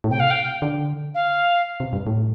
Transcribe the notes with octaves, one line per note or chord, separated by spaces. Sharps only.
A2
C3 G5
F5
G5
D3
F5
C3
G2
A2